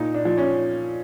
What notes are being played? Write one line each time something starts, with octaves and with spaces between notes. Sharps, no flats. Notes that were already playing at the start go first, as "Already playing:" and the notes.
Already playing: A#2 D#4
D4
F3
C#4